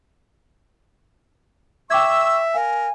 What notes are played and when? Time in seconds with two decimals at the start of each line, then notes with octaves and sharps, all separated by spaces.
1.90 E5 G5 C#6 D6 E6 G#6
2.54 A#4 F5 G#5